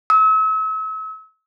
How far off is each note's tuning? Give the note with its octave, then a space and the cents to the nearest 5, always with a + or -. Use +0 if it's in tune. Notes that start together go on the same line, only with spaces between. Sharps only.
E6 -40